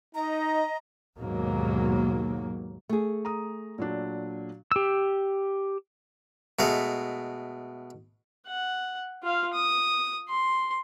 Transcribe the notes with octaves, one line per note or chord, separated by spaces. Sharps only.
D#4 D#5 A#5
D#2 G#2 B2 F#3 A#3
A3 G#4
A#5 D#6
A#2 F#3 D4
G4 E6
B2 G#3 A3 F5
F#5
F4 F5
D#6
C6